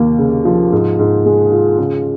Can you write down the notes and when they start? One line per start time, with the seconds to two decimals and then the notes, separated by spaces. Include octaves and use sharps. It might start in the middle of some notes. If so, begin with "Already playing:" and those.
Already playing: D#2 A#3
0.19 C#3
0.45 F3
0.72 G#2
0.99 G#2
1.26 G#3
1.52 F4
1.79 C#3